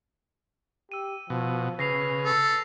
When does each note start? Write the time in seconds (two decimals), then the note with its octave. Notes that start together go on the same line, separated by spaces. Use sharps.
0.92 G4 E6 D#7
1.30 B2 F3
1.79 C#3 B4 A#6 C7 F7
2.25 A4